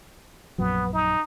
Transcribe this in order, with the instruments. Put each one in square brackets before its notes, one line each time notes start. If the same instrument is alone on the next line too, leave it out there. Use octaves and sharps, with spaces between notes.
[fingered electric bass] A#1 F#2 F#3 [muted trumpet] B3
[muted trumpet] D#4